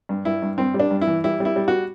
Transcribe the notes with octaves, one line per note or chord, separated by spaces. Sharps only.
G2
G2 E4
G2
G2 C4
G3
D4
G2
E4
E3
G3 E4
G3
E4
G3
F#4